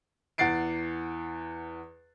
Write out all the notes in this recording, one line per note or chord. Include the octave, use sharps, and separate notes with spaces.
E2 F#5 A6 C7 D7